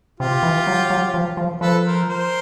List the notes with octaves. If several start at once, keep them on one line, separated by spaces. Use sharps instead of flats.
C3 F4 G4
E3
F#3
F#3
F3
F3
F3 A4 B4
A#4 C5
A#4 C5